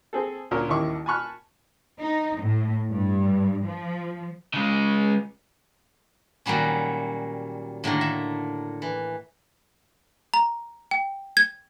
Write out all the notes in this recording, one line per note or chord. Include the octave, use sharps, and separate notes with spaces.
C4 G#4 A4
D2 A#2 C#4 A#4
A1 D#2 D#3 E4 C#6 D6
G#5 A5 B5 C#6 F6 F#6
D#4
A2
G2
F3
C#3 G#3
A#2 D#3 F#3 G3 C#4
A2 D3 D#3 A#3
E5
E3
A#5
G5
G#6